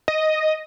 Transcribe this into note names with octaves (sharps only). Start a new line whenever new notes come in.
D#5